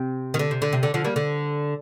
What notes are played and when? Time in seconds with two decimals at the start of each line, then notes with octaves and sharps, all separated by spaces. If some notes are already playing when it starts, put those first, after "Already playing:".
Already playing: C3
0.34 D#3
0.39 D3
0.51 C3
0.62 D3
0.73 C3
0.83 D3
0.94 D3 F3
1.04 G3 A#3
1.16 D3